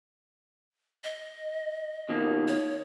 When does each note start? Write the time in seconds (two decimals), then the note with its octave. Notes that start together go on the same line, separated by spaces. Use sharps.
1.04 D#5
2.09 B2 D#3 A#3
2.48 C#5